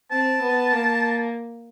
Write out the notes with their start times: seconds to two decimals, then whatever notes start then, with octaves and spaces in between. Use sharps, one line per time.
0.11 C4 A5
0.42 B3
0.73 A#3